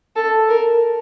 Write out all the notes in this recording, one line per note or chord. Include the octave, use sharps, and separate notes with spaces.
A4
A#4